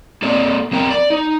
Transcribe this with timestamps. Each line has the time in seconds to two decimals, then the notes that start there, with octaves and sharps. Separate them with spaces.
0.22 A#3 C4 A4 D5
0.72 F2 C4 A#4 G5 A#5
0.91 D5
1.10 D#4